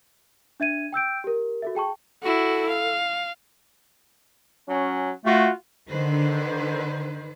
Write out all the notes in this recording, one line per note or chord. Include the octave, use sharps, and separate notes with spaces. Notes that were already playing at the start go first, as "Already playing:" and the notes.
D4 E5 G#6 D#7
G5 E6 G6 D7
G4 A#4
F#4 A4 E5
G#4 G5 A5 C#6
E4 F#4 A4
F5
F#3 C#4
A3 F4 F#4
D3 D#3 B4 C5